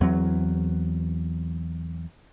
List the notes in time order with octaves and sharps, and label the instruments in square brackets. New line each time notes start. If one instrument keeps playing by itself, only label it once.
[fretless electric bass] E2 F#3 C4